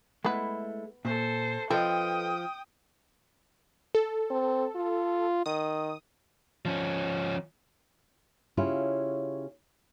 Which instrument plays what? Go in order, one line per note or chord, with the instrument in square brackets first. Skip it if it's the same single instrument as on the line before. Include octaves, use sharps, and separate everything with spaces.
[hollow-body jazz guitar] G#3 A3 E4 [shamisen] B3 B4
[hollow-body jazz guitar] A#2 [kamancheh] A4 C5
[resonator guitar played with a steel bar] F3 [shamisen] C4 [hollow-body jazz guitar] A4 B4 D#5 [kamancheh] G5 D#6
[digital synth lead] A4
[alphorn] C4
F4
[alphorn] D#3 [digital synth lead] D#6
[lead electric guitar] F3 C#4
[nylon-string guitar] C#3 C#4 E4 F4 G4 G#4